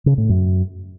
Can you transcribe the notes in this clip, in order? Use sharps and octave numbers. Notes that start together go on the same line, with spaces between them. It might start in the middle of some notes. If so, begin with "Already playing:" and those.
C#3
A2
F#2